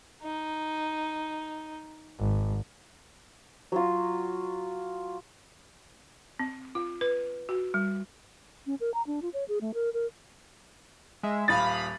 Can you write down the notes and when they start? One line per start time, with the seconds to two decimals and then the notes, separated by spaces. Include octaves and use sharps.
0.23 D#4
2.19 G#1
3.72 F#3 F4
6.39 C4
6.75 F4
7.01 B4
7.49 F#4
7.74 G3
8.67 C#4
8.81 A#4
8.94 A#5
9.07 D4
9.22 F4
9.34 C#5
9.48 G#4
9.61 A3
9.74 A#4
9.94 A#4
11.23 G#3 E5
11.48 D#1 F5 B5 D#6 A6